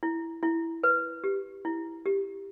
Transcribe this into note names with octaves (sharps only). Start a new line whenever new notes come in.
E4
E4
B4
G4
E4
G4